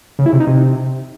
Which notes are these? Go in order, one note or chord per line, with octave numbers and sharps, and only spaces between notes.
C#3
E4
C3
D#4
C3